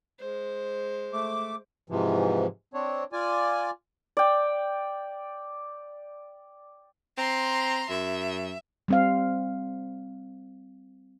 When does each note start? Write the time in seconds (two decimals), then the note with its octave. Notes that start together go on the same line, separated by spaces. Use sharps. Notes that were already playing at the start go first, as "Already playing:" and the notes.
0.19 G#3 C5
1.13 A3 D6
1.90 G#2 C3 E3 F3
2.74 C4 D4 C#5
3.12 F4 D5 G#5
4.17 D5 G5
7.18 C4 A#5 C6
7.90 F#2 E5
8.88 G3 C4 F5